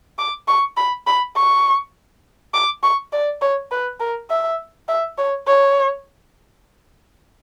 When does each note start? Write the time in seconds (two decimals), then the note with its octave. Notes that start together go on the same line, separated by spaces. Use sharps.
0.19 D6
0.48 C#6
0.77 B5
1.07 B5
1.36 C#6
2.53 D6
2.83 C#6
3.13 D5
3.42 C#5
3.71 B4
4.00 A#4
4.30 E5
4.88 E5
5.18 C#5
5.47 C#5